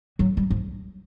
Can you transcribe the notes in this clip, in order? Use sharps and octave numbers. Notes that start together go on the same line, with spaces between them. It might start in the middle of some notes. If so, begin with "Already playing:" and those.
F#3
G3
F3